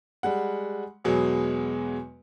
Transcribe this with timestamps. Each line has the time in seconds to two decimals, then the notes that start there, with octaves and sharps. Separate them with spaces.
0.23 G3 G#3 F#5
1.04 E2 B2 F#3 G#3